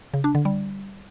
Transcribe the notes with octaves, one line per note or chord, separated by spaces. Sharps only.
C#3
D4
D3
G3